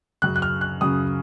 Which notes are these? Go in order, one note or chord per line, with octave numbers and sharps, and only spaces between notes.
F#2 C#3 F#6
F#6
F6
F#6
F#2 C#3 D#6